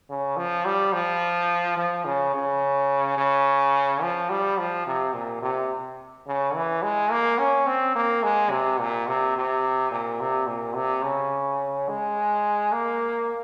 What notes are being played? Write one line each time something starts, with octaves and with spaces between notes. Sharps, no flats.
C#3
F3
G3
F3
F3
C#3
C#3
C#3
F3
G3
F3
C3
A#2
C3
C#3
E3
G#3
A#3
C#4
C4
A#3
G#3
C3
A#2
C3
C3
A#2
C3
A#2
C3
C#3
G#3
A#3